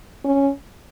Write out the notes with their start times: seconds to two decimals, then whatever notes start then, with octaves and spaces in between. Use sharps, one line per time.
0.24 C#4